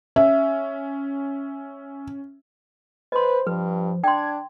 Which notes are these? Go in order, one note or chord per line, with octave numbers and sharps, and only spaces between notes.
C#4 E5
B4 C5 D#5 C6
G2 F3 B4
D4 G5 C6 G#6